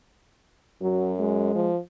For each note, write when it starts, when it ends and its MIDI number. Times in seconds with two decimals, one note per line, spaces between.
0.81 1.50 42
0.81 1.14 54
1.19 1.70 56
1.55 1.79 53